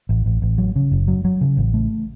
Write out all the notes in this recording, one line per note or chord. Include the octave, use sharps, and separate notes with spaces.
A1
A1
A1
F#3
C#3
F#1
F#3
F#3
C#3
A1
A3